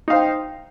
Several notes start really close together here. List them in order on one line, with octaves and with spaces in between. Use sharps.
D#4 F5 C5 G5